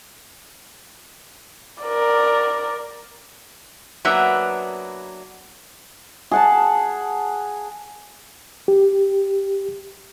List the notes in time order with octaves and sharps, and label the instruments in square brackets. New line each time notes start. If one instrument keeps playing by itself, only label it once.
[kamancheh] A#4 D5
[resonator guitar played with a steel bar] F#3 A#3 B3 D4 E5
[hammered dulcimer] G#4 F#5 A5
[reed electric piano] G4